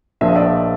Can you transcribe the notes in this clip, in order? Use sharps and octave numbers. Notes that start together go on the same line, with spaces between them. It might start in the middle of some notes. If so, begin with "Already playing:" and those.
A#1 A#2 F3 E5
D#5
D5 E5